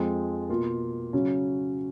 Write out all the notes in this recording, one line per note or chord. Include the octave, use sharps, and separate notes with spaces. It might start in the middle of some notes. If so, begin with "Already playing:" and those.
Already playing: F2 F3 G#3
B2 A#3 F4
C#3 F#3 C#4